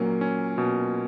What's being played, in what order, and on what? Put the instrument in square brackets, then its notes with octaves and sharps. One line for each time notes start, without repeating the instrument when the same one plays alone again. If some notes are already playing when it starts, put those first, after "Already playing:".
Already playing: [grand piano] A#2 A#3 [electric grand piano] F#3 C#4
[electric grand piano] C#4
B2